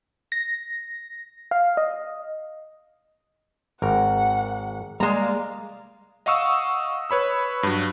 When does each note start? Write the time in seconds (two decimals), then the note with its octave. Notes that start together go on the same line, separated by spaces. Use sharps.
0.32 A#6
1.51 F5
1.77 D#5
3.82 G#1 A#4 F#5
5.00 G3 G#3 A#3 D5 F5 A#5
6.26 D#5 F5 F#5 C#6 D#6 E6
7.10 B4 C#5 B5 E6
7.63 G2 F#3